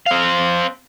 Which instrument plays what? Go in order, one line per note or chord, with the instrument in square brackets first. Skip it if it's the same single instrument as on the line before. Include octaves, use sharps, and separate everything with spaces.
[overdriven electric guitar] C4 F5